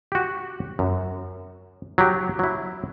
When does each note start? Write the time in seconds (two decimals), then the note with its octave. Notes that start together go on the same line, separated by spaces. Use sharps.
0.12 F#4 G4
0.79 F#2
1.98 F#3 G4
2.39 F#3 E4